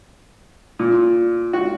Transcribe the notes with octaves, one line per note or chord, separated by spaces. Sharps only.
A#2
F#4